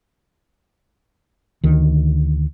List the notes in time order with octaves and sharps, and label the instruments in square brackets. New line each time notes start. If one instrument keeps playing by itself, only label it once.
[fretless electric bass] D2 D#3